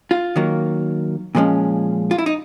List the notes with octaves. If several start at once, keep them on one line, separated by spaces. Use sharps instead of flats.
F4
D#3 F#3 A#3
A#2 F3 G#3 C#4
F4
E4
D#4